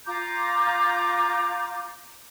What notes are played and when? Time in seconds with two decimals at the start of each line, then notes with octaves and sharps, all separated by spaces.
0.06 F4 A#5 D6 G6